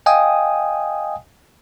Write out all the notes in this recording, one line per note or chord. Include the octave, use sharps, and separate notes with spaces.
D#5 F5 G5 G#5 D#6